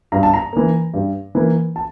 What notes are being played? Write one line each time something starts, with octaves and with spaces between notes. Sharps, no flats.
G2 A#5
A5
A#5
E3 A#3
G2
E3 A#3
A5